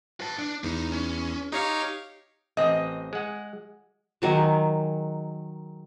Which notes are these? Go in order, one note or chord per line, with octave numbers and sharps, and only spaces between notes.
B4 A5
D4
E2 D#4
C#4
D#4 G4 C#5 F5
A1 C4 D#5
G#3 F#5
D#3 F#3 G#3